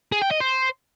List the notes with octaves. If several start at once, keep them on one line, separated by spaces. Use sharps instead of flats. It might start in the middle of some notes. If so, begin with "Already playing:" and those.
G#4
G5
D#5
C5